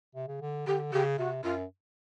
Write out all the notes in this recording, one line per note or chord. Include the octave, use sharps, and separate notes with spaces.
C3
C#3
D3
D3 G4
C#3 G4
C3 F#4
F#2 F4